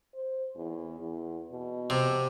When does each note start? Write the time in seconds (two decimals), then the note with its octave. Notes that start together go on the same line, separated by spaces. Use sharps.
0.14 C5
0.55 E2
1.00 E2
1.51 B2
1.90 C3